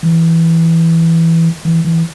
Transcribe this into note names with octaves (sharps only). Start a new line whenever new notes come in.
E3
E3
E3